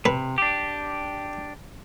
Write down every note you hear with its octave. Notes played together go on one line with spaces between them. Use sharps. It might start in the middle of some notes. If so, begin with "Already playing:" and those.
C3 B4
D4 G4